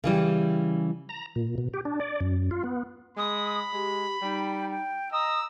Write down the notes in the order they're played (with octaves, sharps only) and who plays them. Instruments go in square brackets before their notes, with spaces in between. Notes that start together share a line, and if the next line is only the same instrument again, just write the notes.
[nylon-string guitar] C#3 E3 G3
[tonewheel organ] A#5
A#2
B2
G4
D4
D5
F#2
F4
B3
[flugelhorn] G#3 [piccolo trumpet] B5 [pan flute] D#6
[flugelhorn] G#3 [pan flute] G4
[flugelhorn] G3 [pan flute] D#4 [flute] G5
[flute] G5
[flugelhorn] D#5 [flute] A#5 [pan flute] D#6 [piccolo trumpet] E6